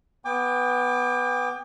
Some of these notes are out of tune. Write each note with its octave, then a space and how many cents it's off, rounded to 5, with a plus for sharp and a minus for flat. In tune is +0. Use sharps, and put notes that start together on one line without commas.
B3 +0 G5 +35 D6 +0